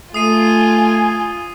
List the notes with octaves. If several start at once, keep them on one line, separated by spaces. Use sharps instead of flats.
A3 F4 G#5 D#6 C7 D#7